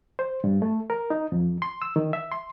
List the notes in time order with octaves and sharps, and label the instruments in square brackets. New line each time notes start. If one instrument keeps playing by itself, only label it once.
[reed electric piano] C5
G2
A3
A#4
D#4
F2
C6
E6
D#3
E5
C6